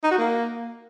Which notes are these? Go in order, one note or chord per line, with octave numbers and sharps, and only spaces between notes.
D#4
F#4
A#3